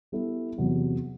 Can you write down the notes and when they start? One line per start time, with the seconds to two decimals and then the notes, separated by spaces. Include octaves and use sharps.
0.12 G3 B3 E4 A4
0.58 E2 C3 F#3 B3